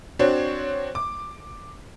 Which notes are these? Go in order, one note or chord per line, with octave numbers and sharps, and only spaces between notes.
C4 D4 F#4 C5 C#5
D6